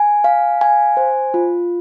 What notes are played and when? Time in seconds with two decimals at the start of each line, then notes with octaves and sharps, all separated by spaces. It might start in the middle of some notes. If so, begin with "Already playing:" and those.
Already playing: G#5
0.24 F5
0.61 G#5
0.97 C5
1.34 F4